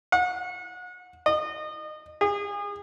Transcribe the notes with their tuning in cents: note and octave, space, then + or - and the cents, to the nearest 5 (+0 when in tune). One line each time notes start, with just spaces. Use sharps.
F#5 -35
D#5 -30
G#4 -35